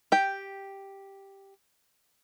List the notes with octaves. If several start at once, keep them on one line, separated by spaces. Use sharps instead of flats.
G4 G5